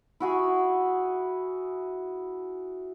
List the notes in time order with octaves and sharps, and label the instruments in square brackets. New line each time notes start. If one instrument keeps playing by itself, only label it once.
[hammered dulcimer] E4 F#4 G#4